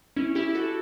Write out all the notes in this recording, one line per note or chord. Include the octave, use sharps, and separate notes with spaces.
C#4 E4
E4 G4
F#4 A4